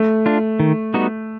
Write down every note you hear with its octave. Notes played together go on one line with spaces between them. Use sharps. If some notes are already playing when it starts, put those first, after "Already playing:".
Already playing: A3
D4 F4
D#3
G3 B3 D#4 F#4